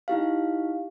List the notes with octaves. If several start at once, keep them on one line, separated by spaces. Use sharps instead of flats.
D#4 E4 G4 F5